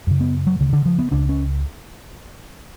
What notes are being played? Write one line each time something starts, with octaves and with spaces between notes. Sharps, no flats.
F#2 C#3
B3
F#3
D2 C#3
D3
F3
B3
C#2 C#3 D4
C#4